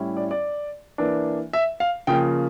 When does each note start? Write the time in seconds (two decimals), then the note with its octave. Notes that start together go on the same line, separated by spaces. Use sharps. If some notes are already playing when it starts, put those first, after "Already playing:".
Already playing: A2 G3 C#4 E4
0.17 D5
0.31 D5
0.98 E3 A#3 D4
1.53 E5
1.80 F5
2.07 C#3 F3 A#3 G5